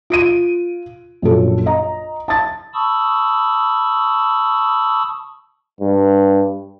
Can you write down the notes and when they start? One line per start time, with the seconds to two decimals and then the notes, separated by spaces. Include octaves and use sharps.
0.10 F4 D7 D#7
1.22 A#1 F#2 A4
1.66 D#5 A#5
2.28 A5 A6
2.74 A5 B5 C#6 D#6 E6
5.81 G2